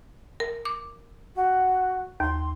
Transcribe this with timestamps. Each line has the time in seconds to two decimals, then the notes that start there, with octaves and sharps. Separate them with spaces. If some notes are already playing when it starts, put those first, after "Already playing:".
0.40 A#4
0.65 D6
1.35 F#4
2.20 D#2 C6